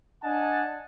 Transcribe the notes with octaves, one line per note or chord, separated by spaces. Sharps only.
D4 D#5 F#5 G#5 A5